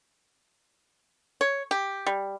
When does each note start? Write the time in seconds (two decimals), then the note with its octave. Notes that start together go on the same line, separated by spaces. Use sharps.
1.41 C#5
1.71 G4
2.06 G3